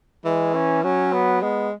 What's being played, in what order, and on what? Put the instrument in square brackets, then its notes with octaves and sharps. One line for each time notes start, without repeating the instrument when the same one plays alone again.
[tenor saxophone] E3 [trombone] G#3
[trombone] C#4
[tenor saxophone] F#3 [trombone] C#4
[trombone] B3
[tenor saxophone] G#3 [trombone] B3